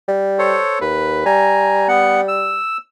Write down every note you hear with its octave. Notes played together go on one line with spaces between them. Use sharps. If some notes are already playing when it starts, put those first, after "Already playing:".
G3
A4 C5 C#5
D#2 B4
G3 G#5 A#5
B3 F#5
E6